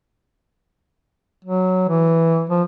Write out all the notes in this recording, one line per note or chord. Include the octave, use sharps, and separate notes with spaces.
F#3
E3
F3